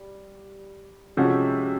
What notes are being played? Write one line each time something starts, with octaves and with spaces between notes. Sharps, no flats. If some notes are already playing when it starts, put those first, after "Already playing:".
Already playing: G3
C3 F3 G#3 C#4 F#4